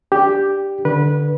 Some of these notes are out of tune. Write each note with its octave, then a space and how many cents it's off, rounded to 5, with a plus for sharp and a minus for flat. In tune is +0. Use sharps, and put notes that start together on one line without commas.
D4 +0 G4 +0
D3 +0 B4 -20